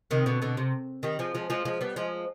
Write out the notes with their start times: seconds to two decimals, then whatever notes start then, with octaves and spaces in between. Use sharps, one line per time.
0.11 C3 D#3
0.26 B2 D3
0.42 B2 D3
0.57 C3
1.03 D#3 G3
1.19 F3 G#3
1.35 F3 G#3
1.50 F3 G#3
1.65 F3 G#3
1.81 G3 B3
1.96 F3 G#3